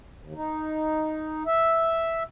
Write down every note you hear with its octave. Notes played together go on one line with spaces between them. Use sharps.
D#2
D#4
E5